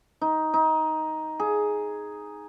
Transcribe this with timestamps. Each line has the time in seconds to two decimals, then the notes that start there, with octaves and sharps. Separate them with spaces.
0.21 D#4
0.54 D#4
1.40 G#4